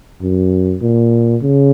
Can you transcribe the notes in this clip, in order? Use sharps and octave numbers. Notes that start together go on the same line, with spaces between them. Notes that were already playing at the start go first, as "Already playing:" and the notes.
F#2
A#2
C#3